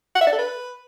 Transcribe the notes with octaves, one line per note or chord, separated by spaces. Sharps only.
F#5
E5
D5
A4
B4